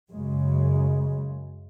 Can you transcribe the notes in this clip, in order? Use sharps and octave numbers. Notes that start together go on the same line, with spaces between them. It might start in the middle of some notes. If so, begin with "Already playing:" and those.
F#2 C#3 G#3